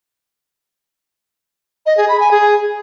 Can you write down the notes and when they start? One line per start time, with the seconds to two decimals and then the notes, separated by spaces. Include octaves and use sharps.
1.86 D#5
1.97 G#4
2.08 B5
2.20 G#5
2.31 G#4